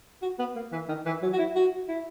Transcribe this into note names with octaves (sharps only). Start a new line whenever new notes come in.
F#4
B3
A#3
E3
D#3
E3
F#3
F#4
E4
F#4
E4